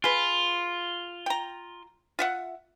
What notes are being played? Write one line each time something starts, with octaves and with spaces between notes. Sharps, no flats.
F4 G#4 B4
G5 A#5
F4 E5 F#5